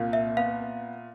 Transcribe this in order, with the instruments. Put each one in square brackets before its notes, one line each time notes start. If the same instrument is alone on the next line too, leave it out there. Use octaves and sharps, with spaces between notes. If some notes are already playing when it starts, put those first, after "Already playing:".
Already playing: [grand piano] C2 A#2 [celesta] F5
[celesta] E5
[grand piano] B3 [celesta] F5